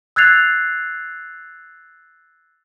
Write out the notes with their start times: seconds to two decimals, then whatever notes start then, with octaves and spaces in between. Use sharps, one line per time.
0.16 E6 F#6 G#6 A6 C7 F7